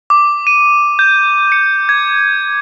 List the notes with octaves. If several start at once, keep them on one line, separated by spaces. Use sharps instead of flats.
D6
D#7
G6
C#7
G#6